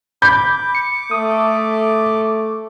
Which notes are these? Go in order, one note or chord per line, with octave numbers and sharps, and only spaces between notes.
B5 D6 G6
C#7
A3 D#6